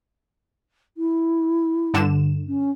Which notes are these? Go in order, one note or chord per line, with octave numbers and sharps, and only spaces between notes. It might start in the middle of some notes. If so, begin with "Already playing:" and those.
E4
G2 D3 E7
C#4